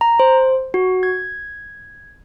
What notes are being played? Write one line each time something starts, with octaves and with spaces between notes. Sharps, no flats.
A#5
C5
F#4
G#6